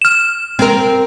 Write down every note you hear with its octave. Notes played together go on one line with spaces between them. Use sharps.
F6 E7
C4 A#4